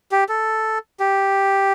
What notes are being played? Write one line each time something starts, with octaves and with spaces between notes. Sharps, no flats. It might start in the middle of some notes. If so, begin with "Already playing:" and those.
G4
A4
G4